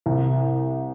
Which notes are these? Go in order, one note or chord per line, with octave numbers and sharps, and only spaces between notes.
C2